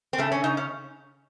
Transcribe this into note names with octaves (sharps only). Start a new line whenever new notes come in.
C4
C#3 A3
C#4
C#3 D#4
C#4